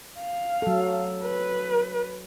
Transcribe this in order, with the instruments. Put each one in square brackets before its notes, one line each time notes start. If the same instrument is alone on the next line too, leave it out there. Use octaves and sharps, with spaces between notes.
[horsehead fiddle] F5
[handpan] F#3 A4
[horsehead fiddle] B4